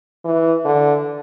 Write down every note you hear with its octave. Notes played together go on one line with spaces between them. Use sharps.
E3
D3